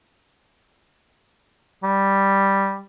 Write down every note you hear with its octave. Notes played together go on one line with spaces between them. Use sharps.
G3